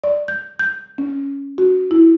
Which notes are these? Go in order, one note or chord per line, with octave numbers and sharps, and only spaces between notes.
D5
G6
G6
C#4
F#4
E4